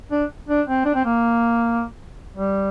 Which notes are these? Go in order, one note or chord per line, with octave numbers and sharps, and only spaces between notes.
D4
D4
C4
D4
C4
A#3
G3